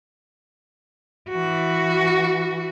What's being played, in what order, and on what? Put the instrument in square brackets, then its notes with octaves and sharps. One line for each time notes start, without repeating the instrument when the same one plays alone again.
[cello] E3 F#4